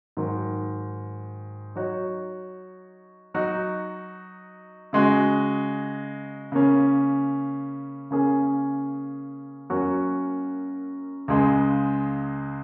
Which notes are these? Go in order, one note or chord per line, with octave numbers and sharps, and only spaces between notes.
G#2 D#3 F#3
F#3 D#4 F#4 C#5
F#3 D#4 F#4
C#3 G#3 F#4
C#3 A#3 C#4
C#3 A#3 C#4 G#4
F#2 F#3 A#3 C#4 F#4
C#2 C#3 G#3